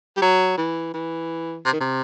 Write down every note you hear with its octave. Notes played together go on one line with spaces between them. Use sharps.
G3
F#3
E3
E3
C3
D#3
C3